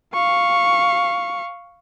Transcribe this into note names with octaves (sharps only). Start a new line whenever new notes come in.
F5 C#6